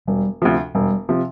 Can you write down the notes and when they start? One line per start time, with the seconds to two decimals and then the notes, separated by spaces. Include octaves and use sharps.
0.07 E1 G3
0.42 D2 C3 F3
0.75 E1 G3
1.09 C3 F3